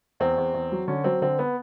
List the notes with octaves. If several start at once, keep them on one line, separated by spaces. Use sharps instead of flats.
E2 C4
E2
E2
F#3
D3 C#4
F#3 C4
D3 C4
B3